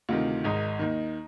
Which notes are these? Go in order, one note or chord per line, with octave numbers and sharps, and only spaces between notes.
D2 C3 D#3 F4
G#1 G#2 D#3 D#4
D#2 D#3